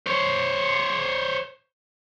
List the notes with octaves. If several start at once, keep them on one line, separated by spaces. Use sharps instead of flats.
C5 C#5